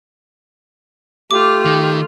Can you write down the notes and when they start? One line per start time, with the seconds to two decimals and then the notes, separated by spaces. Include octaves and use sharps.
1.31 A3 F4 G4 D6
1.66 D#3